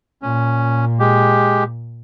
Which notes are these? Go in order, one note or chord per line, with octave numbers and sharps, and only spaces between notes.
A#2 C#4
G#3 G4